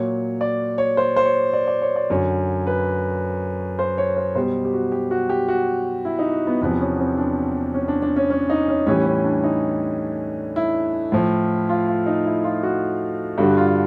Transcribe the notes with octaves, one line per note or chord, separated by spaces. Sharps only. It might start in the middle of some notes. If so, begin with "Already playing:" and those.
Already playing: A#2 F#3 C#5
D5
C#5
C5
C5
C#5
D5
D5
C#5
D5
F#2 D3 F#3 C#5
B4
C5
C#5
C5
B2 G3 C5
G4
F#4
G4
F#4
G4
F#4
E4
D#4
B3
E2 C3 F3 B3
C#4
C4
D4
C#4
D4
D4
C#4
C#4
D#4
C#4
A2 E3 G3 C#4
C#4
D4
D#4
E4
A2 F3
F4
F4
D#4
E4
F4
F#4
G2 D3 G3 F#4
F4